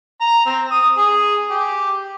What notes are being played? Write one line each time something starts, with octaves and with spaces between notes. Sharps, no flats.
A#5
C4
D#6
G#4
G4